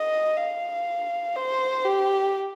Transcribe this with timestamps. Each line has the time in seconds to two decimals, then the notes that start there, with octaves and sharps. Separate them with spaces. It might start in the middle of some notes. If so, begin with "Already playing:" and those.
Already playing: D#5
0.37 F5
1.36 C5
1.85 G4